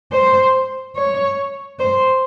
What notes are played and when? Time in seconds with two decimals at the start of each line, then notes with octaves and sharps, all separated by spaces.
0.13 C5
0.96 C#5
1.79 C5